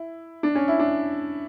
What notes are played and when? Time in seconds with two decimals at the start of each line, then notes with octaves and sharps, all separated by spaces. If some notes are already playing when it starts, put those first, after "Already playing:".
Already playing: E4
0.43 D4
0.55 C#4
0.68 E4
0.79 D4